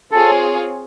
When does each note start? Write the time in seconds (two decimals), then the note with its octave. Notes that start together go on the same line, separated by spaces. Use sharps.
0.11 C4 F4 G#4 A4 C#5